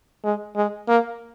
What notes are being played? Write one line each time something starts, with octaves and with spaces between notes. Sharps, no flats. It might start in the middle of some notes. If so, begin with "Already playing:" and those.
G#3
G#3
A#3